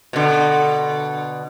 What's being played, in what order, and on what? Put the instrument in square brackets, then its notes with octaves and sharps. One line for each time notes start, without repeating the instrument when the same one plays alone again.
[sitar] B2 D3